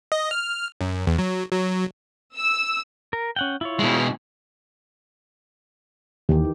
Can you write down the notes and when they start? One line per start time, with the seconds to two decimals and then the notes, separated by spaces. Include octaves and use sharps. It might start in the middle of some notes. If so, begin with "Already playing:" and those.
0.12 D#5
0.31 F6
0.81 F#2
1.07 E2
1.19 F#3
1.51 F#3
2.36 E6
3.13 A#4
3.36 C#4 F#5 G5
3.61 E4 F4 C#5
3.79 B2 G#3
6.29 D#2 D#3 E3 G4